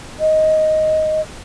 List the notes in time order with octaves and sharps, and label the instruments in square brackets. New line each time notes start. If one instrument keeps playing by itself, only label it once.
[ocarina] D#5